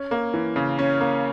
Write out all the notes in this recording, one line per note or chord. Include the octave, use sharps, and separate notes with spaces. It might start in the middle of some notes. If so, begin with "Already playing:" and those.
Already playing: C#4
A#3
E3
C#3
C#4
A#3